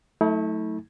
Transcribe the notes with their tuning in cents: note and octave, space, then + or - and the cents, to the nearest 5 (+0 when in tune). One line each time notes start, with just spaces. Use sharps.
F#3 -15 A3 +0 E4 -45